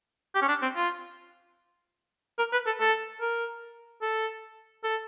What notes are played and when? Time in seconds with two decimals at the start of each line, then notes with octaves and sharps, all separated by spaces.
0.35 G4
0.42 C#4
0.48 D4
0.62 C4
0.76 F4
2.39 A#4
2.53 B4
2.67 A4
2.80 A4
3.21 A#4
4.02 A4
4.84 A4